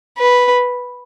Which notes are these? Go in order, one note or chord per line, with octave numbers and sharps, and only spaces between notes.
B4